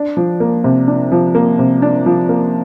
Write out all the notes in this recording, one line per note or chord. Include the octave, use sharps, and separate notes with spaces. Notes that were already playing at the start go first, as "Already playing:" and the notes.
Already playing: D4
F3
A#3
C3
D4
F3
A#3
C3
D4
F3
A#3